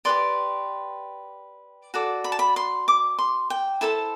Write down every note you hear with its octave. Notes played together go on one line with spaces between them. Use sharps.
G4 B4 D5 C6
F#4 A4 D5
B5
A5
B5
C6
D6
C6
G5
E4 A4 C5 A5